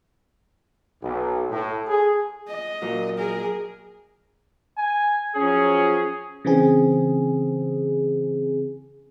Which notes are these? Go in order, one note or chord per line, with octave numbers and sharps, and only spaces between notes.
B1
A2
G#4
D#5
A#2 F#3 A#3
G#4 A#4
G#5
F3 F#3 C#4 G#4
C#3 E3 C4 G#4